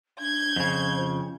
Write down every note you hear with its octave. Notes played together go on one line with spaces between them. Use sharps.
D4 G6 G#6
F2 C#3 C5
F4